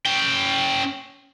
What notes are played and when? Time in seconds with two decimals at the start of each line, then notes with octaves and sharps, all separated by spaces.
0.06 C#4 G5